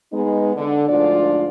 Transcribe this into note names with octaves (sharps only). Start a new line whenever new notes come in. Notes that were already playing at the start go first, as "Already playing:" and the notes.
G#3 B3 D#4
D3
D2 G#2 F3 D4 F4 D5